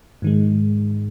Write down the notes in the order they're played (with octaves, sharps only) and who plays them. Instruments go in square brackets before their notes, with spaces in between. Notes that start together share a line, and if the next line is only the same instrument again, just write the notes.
[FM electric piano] G#2 D#3 G#3